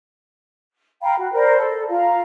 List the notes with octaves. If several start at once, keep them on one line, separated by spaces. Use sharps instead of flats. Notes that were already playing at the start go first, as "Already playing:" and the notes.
F5 G5 A#5 B5
F#4
A#4 C5 D5 B5
A4
F4 F5 A#5